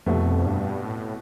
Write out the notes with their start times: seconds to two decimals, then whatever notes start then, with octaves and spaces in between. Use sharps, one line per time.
0.06 C2 F2 B2 A3
0.46 G2
0.85 A2